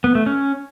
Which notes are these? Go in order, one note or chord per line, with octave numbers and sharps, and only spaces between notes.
B3
A3
C#4